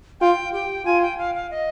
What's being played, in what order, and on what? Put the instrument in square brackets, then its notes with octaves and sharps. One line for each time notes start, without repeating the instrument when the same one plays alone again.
[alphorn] F4 [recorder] G5
[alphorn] G4 [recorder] G5
[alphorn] F4 [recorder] G#5
[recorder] G5
F5
F5
D#5